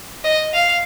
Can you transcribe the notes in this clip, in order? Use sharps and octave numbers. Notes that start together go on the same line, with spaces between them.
D#5
F5